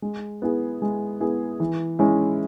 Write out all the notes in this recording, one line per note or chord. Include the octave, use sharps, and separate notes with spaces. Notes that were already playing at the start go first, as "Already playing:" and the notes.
G#3
B3 E4 G#4
G#3
B3 E4 G#4
E3
G#3 C#4 E4